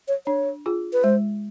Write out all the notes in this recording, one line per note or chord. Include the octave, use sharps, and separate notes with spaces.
C#5
D4 C#5
F4 G#4
B4
G#3 C5